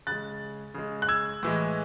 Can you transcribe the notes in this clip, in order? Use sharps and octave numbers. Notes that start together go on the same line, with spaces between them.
C#3 G#3 F#6 A6
C#3 G#3
F#6
E6 G#6
A2 E3 G#3